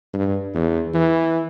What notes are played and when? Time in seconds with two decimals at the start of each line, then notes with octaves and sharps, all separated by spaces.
0.13 G2
0.54 E2
0.94 E3